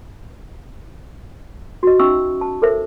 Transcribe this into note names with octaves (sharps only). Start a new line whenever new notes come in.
F#4 D#5
C#4 D#4 E5 C#6 E6
A5
A4 A#4 C5 E5